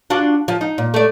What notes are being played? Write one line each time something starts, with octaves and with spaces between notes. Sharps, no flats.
D4 F4 F#4
F3
D#4
A#2
A3 D5